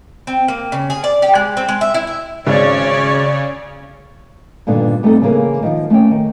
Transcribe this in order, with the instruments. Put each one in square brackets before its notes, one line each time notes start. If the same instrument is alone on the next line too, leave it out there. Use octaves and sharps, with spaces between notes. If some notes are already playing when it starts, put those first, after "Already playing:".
[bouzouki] C4
A#3
C#3
G#4
D5
G4
G#3
C4
G#3
E5
E4
E5
[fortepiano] G#1 [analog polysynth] C#3 [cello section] C#4 C#5 D5
[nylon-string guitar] G2 A#2 D3 D#3 B3
G3 A3 B3 C4 D#4 A4
C#3 E3 A#3 G#4 A#4
D#3 F3 D#4
A3 A#3 C#4 C#5 G5
D#3